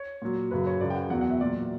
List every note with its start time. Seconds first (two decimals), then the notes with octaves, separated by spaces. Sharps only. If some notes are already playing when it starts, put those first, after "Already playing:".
Already playing: C#5
0.22 A#2 F#3
0.51 F#2 C#3 F#3 B4
0.66 C#5
0.81 F#2 C#3 F#3 D5
0.90 G5
0.95 F#5
1.10 E2 B2 F#3 F#5
1.21 F#5
1.31 E5
1.40 A#2 F#3 D5